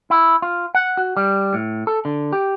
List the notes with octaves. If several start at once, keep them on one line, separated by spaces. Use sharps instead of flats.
E4
F4
F#5
F#4
G3
A2
A4
D3
G4